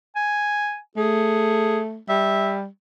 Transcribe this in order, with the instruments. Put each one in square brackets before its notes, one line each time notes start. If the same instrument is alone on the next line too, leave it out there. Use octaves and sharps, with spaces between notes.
[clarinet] G#5
[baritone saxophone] A3 [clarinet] G#4
[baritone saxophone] G3 [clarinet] E5